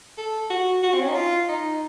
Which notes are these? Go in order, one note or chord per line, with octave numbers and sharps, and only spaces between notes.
A4
F#4
F#4
C4
C#4
D#4
F4
D#4